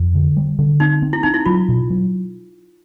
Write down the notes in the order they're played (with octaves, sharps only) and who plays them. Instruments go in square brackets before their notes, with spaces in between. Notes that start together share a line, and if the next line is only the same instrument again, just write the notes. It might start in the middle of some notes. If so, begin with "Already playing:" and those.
Already playing: [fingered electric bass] F2
D3
G3
D3
[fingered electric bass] C4 [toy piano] D#4
[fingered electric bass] C4
[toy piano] E4
[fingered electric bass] C4 [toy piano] D#4
[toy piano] E4
[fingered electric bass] F#3 [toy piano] F4
[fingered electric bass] B2
F#3